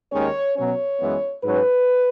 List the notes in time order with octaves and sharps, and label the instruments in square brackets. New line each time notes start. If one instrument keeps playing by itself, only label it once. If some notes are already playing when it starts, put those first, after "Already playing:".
[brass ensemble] D#2 D#3 G#3 C#4 C#5
B2 F#3 C#4 C#5
F#2 E3 G#3 B3
G#2 F#3 C#4 B4